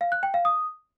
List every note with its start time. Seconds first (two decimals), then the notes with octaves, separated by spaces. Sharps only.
0.01 F5
0.12 F#6
0.23 G5
0.34 F5
0.45 D#6